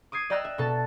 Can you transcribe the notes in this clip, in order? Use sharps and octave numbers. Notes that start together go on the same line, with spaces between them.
D6 D#6 G#6 C7
D5 D#5 G5 A#5 E6 F#6
E5
B2 A4 A5